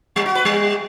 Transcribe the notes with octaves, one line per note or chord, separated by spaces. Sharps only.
G3
F#4
B4
G3